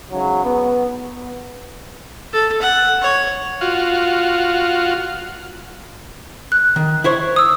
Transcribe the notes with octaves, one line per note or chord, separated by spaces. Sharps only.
G#2 C#3 F#3
B3
A4
F#5
C#5
F4 F#4
F#6
D#3
E4 C5 C#5
D#6 E6